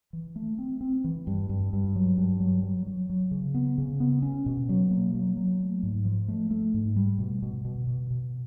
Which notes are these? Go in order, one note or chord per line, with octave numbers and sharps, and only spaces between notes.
E3
A3
C4
C4
E3
G2
G2
G2
F#3
G2
F#3
F#3
F#3
F#3
C#3
B3
C#3
B3
C#4
B2
F#3
A#3
F#3
F#3
A3
G#2
F3
A3
A3
G#2
G3
B2
B2
B2
B2
B2